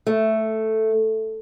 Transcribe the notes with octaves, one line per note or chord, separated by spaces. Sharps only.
A3